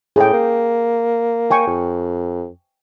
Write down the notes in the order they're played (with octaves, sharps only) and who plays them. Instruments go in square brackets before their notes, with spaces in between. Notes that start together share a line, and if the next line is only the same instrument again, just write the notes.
[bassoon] A2 [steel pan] G#4 G5
[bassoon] A#3
[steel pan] G5 G#5 C#6
[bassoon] F2